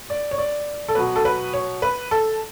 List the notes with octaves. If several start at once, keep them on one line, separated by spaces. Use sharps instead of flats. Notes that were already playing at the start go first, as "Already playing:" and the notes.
D5
C#5
D5
A4
B2 F#3 B4
A4
B4
C#5
B4
A4